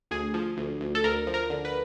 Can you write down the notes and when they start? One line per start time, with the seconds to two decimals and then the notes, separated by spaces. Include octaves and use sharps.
0.11 D2 G#4
0.34 F3
0.57 D2
0.81 D2
0.95 A4
1.04 D2 A#4
1.27 F3
1.34 A#4
1.50 D3
1.65 B4